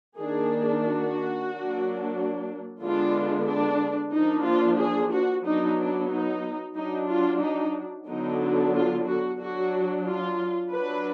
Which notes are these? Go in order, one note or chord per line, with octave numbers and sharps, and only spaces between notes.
D#3 A#3 D4 G#4
F#4
F#3 A#3 D4
D3 G#3 B3 D4 F4
D4
F3 A#3 D4 D#4
F4
G#4
F#4
F#3 B3 D4 D#4
D4
D#4
F#3 D4 D#4
F4
D#4
D3 F#3 B3 D4 D#4
F4
F#4
F#3 D4 F#4
F4
F#3 D4 B4